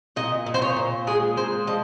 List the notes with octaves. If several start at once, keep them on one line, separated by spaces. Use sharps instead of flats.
A#2 D#5
A#2
C5
C#5
A#2
G#3 G#4
A#2 C5
F3 D#5